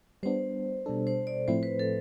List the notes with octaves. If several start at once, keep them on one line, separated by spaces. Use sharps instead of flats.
G3 B3 D4 C5
B2 G3 D4 A4
C5
D5
A2 F3 A3 C4 E4 C5
B4
A4